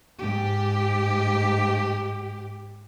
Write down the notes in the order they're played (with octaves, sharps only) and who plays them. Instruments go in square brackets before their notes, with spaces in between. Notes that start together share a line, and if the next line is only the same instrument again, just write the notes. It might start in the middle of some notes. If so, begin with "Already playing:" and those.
[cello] G#2 G4